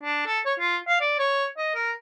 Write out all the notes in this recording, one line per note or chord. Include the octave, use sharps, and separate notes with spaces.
D4
A4
C#5
F4
F5
D5
C#5
D#5
A#4